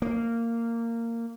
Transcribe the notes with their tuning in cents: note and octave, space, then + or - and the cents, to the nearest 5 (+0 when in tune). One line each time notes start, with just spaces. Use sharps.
A#3 -15